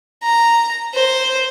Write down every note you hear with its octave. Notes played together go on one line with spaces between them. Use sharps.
A#5
C5